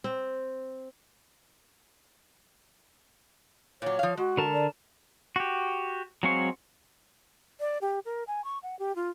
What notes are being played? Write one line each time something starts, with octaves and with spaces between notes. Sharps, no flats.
C4
A#2 F#3 C#5
F3 F5
G#3 F#4
D3 A#4 A5
D5
F#4 G4
F#3 G#3 C4 F5 C#6
D5
G4
A#4
G#5
C#6
F#5
G4
F4